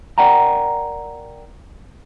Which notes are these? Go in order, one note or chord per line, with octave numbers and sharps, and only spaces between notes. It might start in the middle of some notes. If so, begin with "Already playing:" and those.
A#4 D5 F#5 G5 A#5